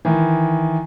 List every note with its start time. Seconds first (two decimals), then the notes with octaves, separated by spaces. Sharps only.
0.05 D#3 E3